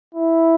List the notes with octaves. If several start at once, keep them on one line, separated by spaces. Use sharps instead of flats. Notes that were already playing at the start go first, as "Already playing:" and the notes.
E4